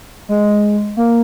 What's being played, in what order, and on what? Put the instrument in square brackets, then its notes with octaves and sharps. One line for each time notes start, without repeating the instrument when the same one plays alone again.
[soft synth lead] G#3
A#3